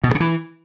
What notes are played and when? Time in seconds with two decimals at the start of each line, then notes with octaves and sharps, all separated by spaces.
0.04 B2
0.09 G2
0.15 C#3
0.20 E3